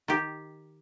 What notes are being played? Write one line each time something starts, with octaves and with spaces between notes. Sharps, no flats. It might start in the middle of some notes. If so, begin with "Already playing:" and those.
D#3 G4